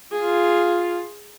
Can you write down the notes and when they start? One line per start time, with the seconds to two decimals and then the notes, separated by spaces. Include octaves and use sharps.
0.12 F4 G#4